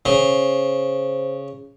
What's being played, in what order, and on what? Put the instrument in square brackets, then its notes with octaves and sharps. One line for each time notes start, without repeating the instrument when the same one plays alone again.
[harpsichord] C#3 [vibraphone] C5